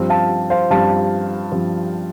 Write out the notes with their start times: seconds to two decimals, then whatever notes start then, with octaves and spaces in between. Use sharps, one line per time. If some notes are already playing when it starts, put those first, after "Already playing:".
Already playing: G2 F3 C4
0.09 F5 A5
0.50 C5 F5
0.70 G2 F3 C4 F5 A5
1.52 G2 F3 C4